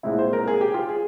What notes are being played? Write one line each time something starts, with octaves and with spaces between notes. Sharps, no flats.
C2 A#2 G#3 C4 E4
C5
A#4
G#4
G4
F4
G#4